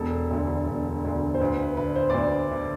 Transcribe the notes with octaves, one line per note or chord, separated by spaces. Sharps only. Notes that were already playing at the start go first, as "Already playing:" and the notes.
Already playing: E1 A4
D2 D3
E1
D2 D3
C5
D2 B4
B4
D3 B4
C5
D5
D2 C5
D3